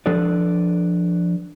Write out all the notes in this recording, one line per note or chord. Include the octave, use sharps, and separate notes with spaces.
F3 D4 A4 B4 D5